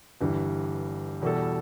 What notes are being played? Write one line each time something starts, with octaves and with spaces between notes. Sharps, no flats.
G1 G2 E3 G3
E2 B2 G3 E4 A4